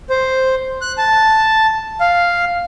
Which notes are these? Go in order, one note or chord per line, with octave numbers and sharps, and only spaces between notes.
C5
F#6
A5
F5